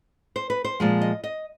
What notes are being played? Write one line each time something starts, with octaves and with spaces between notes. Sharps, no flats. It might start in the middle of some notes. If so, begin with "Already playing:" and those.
C5
B4
C5
A#2 F3 G#3
D#5
D#5